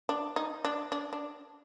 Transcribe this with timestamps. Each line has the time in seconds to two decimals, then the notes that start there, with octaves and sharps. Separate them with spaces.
0.09 D4
0.36 D#4
0.65 D4
0.92 D4
1.13 D4